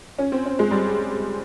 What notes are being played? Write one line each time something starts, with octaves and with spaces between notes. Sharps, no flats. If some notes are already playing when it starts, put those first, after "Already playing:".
C#4
C4
C#4
G#3
G3